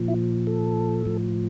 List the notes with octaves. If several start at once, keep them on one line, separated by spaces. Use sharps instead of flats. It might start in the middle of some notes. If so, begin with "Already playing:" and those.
Already playing: A#2 F3
E4
A4
A2 F3